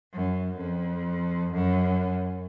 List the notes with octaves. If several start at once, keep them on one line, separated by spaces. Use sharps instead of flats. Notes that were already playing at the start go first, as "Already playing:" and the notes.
F#2
F2
F#2